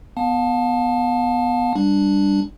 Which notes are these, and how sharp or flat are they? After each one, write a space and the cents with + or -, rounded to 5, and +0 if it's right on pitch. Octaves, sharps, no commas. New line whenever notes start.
B3 +0 F5 +40 A5 +0
G3 +10 D4 +0